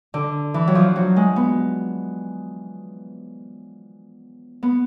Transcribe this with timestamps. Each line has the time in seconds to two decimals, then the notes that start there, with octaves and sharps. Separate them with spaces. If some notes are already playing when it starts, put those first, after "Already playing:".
0.14 D3
0.54 E3
0.68 F#3
0.75 F3
0.96 F#3
1.16 G#3
1.36 B3
4.63 B3